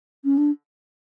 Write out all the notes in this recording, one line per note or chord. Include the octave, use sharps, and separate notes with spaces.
C#4
D4